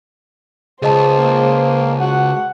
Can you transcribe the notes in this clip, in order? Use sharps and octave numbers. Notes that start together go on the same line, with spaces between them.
C#2 G#4 C5 D#5 A5
A#3
F#4 F#5